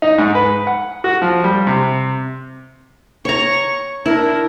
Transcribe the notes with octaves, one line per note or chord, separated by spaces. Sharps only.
D#4
G#2
B4
F#5
F#4
F3
G3
C3
C#5 A#5 C#6
D4 E4 A#4